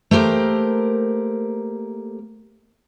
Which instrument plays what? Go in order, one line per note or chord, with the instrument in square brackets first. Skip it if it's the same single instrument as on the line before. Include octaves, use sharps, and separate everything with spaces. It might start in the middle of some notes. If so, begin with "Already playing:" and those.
[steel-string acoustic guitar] A3 A#3 G4 A#4 C5